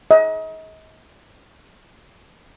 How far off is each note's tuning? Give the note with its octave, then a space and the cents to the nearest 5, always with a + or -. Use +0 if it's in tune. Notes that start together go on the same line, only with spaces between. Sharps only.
D#5 +40